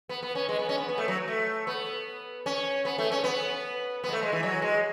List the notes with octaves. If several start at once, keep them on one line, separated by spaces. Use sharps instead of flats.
B3
B3
C#4
G#3
B3
C#4
B3
B3
A3
F#3
A3
B3
C#4
B3
A3
C#4
B3
B3
G#3
A3
G#3
E3
F#3
G#3